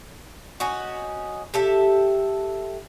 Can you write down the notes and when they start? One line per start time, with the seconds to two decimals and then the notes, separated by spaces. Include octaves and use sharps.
0.60 C#4 D#4 F#4
1.54 G4 A4 E5